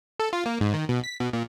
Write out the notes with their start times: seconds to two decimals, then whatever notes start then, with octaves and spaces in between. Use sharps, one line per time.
0.19 A4
0.33 F4
0.46 A#3
0.61 G#2
0.74 D#3
0.89 B2
1.04 B6
1.20 B2
1.33 A#2